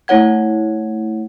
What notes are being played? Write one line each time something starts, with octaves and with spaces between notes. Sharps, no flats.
A3 E4 C#5 F#5 G#6